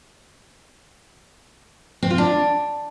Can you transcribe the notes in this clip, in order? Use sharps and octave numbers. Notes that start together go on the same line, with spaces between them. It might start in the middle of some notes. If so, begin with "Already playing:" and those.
C4
F4
D4